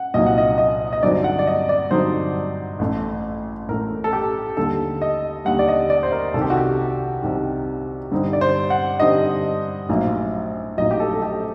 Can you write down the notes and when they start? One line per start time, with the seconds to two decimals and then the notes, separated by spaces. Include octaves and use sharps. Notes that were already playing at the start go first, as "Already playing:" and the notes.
Already playing: F#5
0.14 C2 A#2 F#3 A#3 D#4 D#5
0.27 F#5
0.38 D#5
0.58 D#5
0.93 D#5
1.03 G2 D3 F#3 C4 D#4 D5
1.24 F#5
1.39 D5
1.47 D#5
1.69 D5
1.90 G2 D3 F#3 C4 D#4 C5
2.79 A1 A2 A3
3.68 A1 A2 A3 A#4
4.04 A4
4.13 G4
4.57 D#2 D3 G3 A4
5.02 D#5
5.45 D#2 D3 G3 F#5
5.59 D5
5.68 D#5
5.90 D5
6.03 C5
6.12 A#4
6.34 C2 C3 D#3 A4
6.41 G4
6.50 F#4
6.57 G4
7.22 C2 C3 D#3
8.12 G2 D3 G3 C4 D#4
8.33 D5
8.41 C5
8.70 F#5
9.00 G2 D3 G3 C4 D#4 D#5
9.89 A#1 A2 F#3 A#3 D#4
10.77 A#1 A2 F#3 A#3 D#4 D#5
10.91 G4
11.00 A4
11.13 A4
11.22 G4